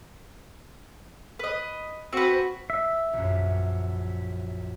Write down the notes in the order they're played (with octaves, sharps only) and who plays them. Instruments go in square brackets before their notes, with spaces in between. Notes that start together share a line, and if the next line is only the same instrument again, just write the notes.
[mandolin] B4 D#5
[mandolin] C4 B4 [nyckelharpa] F#4
[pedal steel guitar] E5
[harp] A#1 F#2